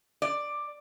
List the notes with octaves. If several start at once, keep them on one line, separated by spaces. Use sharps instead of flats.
D5